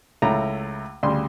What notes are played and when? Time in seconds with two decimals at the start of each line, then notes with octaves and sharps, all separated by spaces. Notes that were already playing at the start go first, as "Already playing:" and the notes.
0.22 C#2 A3 E4 A#5
1.03 D2 C#3 G3 C6